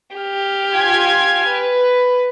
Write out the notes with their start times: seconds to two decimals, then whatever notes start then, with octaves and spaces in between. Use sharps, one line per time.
0.16 G4 F6
0.74 F4 G#5 G#6
1.48 B4